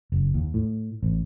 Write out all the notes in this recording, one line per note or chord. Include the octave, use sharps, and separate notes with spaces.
F#1
D#2
A2
A1